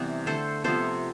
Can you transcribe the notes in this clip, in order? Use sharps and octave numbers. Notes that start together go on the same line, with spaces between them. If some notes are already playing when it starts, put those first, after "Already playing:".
Already playing: C3 E3 G3 B3
D3 A3 A4 C5
C3 F3 B3 A4 C5